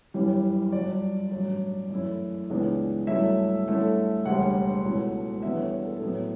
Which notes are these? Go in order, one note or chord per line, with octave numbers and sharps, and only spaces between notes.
G1 F#2 E3 G3 C#4
G1 G2 F#3 D5
A1 G2 F#3
F#2 E3 A3 C#4 E4
C#2 C#3 E3 B3 D4
G2 F#3 A3 C#4 E4 E5
G2 D3 A3 C#4 E4
E1 D2 C#3 G3 F#5
C#2 B2 A3 C#4 E4
E2 D3 G3 B3 D4 E5
C#5
A4
A2 F#3 B3 E4